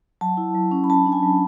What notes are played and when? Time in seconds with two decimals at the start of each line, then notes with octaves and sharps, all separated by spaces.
0.21 F#3 A5
0.37 E4
0.55 F#3
0.71 C#4
0.84 B5
0.90 F#3 A5
1.06 D4
1.13 G#5
1.23 F#3